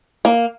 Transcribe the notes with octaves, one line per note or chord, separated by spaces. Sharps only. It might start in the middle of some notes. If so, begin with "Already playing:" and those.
A#3